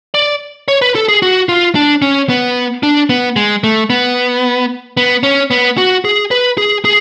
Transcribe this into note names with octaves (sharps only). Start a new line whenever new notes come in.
D5
C#5
B4
A4
G#4
F#4
F4
D4
C#4
B3
D4
B3
G#3
A3
B3
B3
C#4
B3
F#4
G#4
B4
G#4
G#4